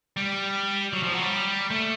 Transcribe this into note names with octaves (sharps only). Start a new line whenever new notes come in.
G3
F#3
F3
F#3
G3
A3